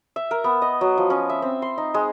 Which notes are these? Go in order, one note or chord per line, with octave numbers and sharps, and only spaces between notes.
E5
A#4
B3
D#5
F#3
F3
C#4
E5
C4
C6
D#4
G#3